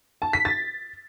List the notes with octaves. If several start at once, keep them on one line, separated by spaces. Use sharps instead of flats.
A5
B6
A6